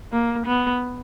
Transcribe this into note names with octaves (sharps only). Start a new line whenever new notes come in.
A#3
B3